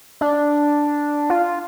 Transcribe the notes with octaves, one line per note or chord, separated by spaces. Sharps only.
D4
F4